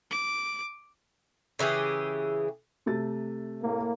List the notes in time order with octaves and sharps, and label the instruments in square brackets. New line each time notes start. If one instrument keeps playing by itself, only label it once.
[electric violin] D6
[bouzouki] C#3 E3 G4 G#4
[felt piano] C3 A3 A6
[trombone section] A2 A#3